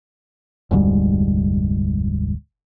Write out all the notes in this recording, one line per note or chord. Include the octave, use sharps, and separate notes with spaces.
F1 D2 G#2 G3